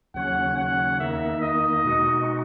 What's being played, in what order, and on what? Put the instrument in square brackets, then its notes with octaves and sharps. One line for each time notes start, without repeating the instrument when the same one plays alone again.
[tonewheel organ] D#2 C#3 F#3 C#4 [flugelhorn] F#5
[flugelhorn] F#5
[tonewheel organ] E2 D#3 A#3 D#4 [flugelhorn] E5
[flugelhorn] D#5
[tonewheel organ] B2 G#3 D#4 F#4